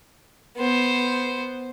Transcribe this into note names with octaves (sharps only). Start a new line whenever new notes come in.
B3 C5